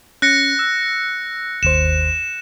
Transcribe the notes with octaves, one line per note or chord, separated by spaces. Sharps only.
C#4 F#6 A#6 C#7
E6
G1 D#2 C5 E7